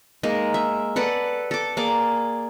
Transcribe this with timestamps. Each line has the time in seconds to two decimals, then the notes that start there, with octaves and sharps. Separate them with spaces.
0.23 G#3 A#3 D#4 A#4
0.54 E5
0.96 A4 B4 D5 F#5
1.51 A4 D6
1.77 A#3 G#4 D5 D6